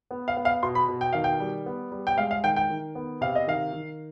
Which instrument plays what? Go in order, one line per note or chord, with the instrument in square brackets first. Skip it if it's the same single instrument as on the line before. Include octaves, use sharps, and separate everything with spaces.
[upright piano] B3
F5
B3
F5
B2 C6
B5
B2
G5
D#3 F5
G5
G3
B3
G3
G5
G#3 F5
F5
D#3 G5
G5
D#3
B3
C3 F5
D#5
D#3 F5
D#3